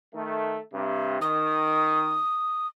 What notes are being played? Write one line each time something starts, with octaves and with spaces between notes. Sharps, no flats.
D#3 A3
G2 C3
D#3 D#6